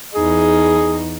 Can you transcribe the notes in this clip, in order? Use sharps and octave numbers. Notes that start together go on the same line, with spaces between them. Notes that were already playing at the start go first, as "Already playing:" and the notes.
E2 D#4 G#4